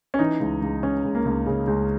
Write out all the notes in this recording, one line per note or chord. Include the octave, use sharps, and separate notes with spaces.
C#4
E3 D#4
C#2
C#2
C#3 C#4
C#2
A#3
C#2
C#3
C#2